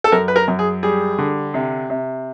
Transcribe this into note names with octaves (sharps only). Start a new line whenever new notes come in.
A4
F#2 A#4
B4
A#4
F#2
G#4
G3 G#4
D3
C3
C3